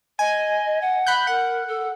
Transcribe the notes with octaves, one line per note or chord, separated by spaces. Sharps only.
D#5 G#5
F#5
B5 F#6 G6
A#4 F#5
A4